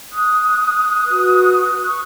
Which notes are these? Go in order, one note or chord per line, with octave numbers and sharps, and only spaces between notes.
D#6 F#6
F#4 B4
C#6